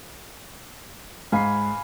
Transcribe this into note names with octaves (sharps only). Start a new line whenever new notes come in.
G#2 F5 G#5 B5 C7